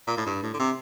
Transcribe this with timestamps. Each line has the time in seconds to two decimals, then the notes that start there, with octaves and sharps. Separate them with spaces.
0.07 A#2
0.17 A2
0.26 G2
0.42 A2
0.54 D3
0.59 C3